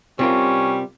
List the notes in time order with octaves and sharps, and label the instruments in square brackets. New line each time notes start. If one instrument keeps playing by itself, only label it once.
[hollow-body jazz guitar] C3 F4 A#4 [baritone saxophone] G3 [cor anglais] C#4